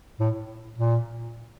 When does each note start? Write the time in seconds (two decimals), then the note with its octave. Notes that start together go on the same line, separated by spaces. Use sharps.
0.20 A2
0.78 A#2